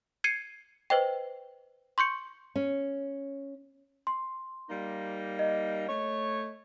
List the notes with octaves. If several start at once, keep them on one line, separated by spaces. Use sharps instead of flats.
G#6 C7 C#7 D#7
B4 C5 D#5 G5
C6 C#6 G6 C#7
C#4
C6
G3 A#3 D#4
D#5
A3 C#5